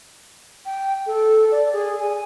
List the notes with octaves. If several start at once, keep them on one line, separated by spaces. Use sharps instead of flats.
G5
A4
D5
G#4
G#5